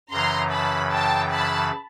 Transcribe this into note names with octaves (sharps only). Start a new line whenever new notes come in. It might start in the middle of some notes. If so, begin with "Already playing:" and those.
F#2 C#3 E3 A#5 C6
A5 B5
G5 A5
A5 B5